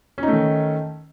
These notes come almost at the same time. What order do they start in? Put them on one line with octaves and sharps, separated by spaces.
C#4 D#4 A3 D#3